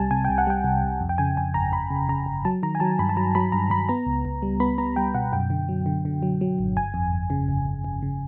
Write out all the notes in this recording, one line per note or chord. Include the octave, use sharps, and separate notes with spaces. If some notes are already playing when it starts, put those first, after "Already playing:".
Already playing: C2 C3 G3 G#5 A5
C3 G#5
C2 G5
F#5
G3 G5
C2
C2
F2
G5
C#3 G#5
F2 G#5
G1 A#5
G1 B5
C#3
C#3 A#5
G1
F#3 A5
D#3 A#5
G#5
F#3 A5
G2 B5
A5
F#3 A#5
F#3 B5
G2 A#5
G2 B5
B3 A#5
C#2
C#2
G3
B3 B5
B3 A#5
G3 G5
B2 F#5
F#2 G5
D3
F#3
D3
D3
F#3
F#3
G#1
G1 G#5
F2
G1
C#3
G1
G1
G1
C#3